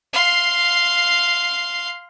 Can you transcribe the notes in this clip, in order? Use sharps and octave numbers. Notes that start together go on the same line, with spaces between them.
F5 C6